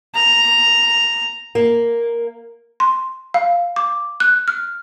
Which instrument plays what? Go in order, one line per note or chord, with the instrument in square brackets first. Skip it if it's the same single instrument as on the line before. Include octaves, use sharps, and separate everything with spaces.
[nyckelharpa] A#5
[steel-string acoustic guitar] A#3
[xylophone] C6
F5
D6
F#6
F6